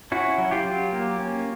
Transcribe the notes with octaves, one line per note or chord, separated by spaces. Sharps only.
C#4 E4 F#4
F#3
F4 G4
F#3
A#3
C#4